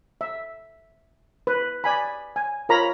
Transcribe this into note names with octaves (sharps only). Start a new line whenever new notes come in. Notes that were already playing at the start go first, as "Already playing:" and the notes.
E5
B4
D5 G#5 B5
G#5
F4 A#4 C#5 A#5 B5